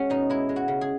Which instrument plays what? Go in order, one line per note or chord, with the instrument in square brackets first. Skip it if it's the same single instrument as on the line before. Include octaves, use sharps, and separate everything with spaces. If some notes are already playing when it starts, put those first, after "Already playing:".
Already playing: [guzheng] G#3 C#4 F#4
B2 D#4
G#3 E4
G#3
F#4
C#3
G#4